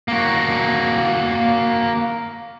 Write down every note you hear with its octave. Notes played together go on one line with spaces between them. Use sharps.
A#3 F#4